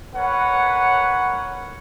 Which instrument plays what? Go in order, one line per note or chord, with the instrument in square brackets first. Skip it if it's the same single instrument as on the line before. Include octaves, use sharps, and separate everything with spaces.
[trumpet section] A#4 B4 C#5 F#5